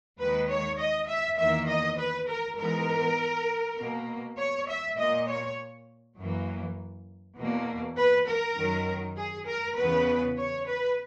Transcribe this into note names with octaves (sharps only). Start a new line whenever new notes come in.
D#2 D#3 G#3 B4
C#5
D#5
E5
E2 D#3 A#3 E5
D#5
B4
A#4
G#2 E3 G#3 B3 A#4
B2 A#3
C#5
E5
A#2 A#3 D#5
C#5
F#2 E3 A#3
E2 B2 A#3
B4
A#4
F#2 D#3 F#3
G#4
A#4
E2 C#3 E3 B3 B4
C#5
B4